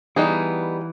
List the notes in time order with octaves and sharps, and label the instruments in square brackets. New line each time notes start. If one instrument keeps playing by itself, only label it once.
[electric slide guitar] E3 [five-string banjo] G3 B3 D#4 G#4